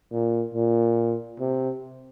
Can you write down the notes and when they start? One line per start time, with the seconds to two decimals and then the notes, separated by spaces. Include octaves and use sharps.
0.12 A#2
0.54 A#2
1.39 C3